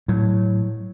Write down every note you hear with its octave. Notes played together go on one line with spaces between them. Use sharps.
A2 F#3